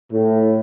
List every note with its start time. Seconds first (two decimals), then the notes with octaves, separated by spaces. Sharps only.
0.12 A2